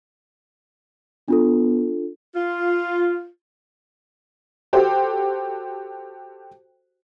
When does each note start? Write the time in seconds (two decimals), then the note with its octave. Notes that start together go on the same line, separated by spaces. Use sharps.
1.28 B3 D4 F4 A4
2.35 F4
4.73 F#4 G4 A4 C5